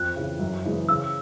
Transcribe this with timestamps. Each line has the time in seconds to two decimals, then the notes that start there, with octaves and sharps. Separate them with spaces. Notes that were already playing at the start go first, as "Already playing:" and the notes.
Already playing: F2 F#6
0.16 C#3 E3
0.40 F#2
0.65 C#3 E3 G#3
0.89 C#3 E6